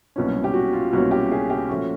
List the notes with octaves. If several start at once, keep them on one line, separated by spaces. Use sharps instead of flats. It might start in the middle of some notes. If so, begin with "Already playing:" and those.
C2 B2 F#3 A#3 C#4
G4
F#4
F4
C2 B2 F#3 A#3 C#4 F#4
G4
G#4
G4
A#2 F3 A3 C#4 F#4